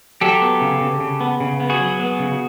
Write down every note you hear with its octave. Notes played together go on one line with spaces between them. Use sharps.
F#3 G4 A4
B3
C#3
C#3
C#3
B3
C#3
B3
F#4 G#4
F#3
B3
C#3